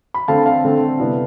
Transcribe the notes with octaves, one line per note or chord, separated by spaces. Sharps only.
B5
D3 A3 C4 F5 A5
F5 A5
D3 A3 C4
C3 G3 B3 E4